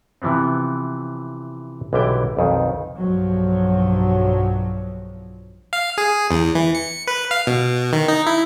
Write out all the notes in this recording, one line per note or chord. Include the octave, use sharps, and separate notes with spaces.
C3 E3 F3 B3 C4
B1 D3 E3 G3 E4 G5
B1 F2 D#3
B1 G2 F3 F#3
F5
G#4
E2
E3
C#7
B4
F5
B2
D#3
D#4
E4